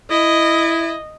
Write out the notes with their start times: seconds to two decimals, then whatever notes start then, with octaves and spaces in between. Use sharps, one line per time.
0.10 E4 D#5